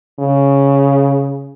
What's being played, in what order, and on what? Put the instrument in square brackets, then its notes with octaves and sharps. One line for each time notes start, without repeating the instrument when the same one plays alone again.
[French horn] C#3